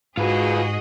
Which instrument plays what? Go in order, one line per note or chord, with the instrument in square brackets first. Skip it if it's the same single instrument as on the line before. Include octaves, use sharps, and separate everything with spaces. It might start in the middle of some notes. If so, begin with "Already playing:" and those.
[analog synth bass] G#2 [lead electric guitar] F4 B4 [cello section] F#4 G#4 D#5